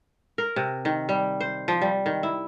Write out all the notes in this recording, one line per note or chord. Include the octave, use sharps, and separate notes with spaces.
A#4
C3
D#3
G3
C5
F3
G3
D#3
E4